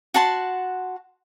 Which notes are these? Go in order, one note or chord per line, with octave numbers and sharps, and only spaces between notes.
F#4 F#5 A5 C6